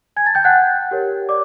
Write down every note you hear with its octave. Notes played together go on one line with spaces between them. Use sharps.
G#5 G#6
A5 A6
G5 G6
F#5 F#6
G4 A#4 C#5
D5 D6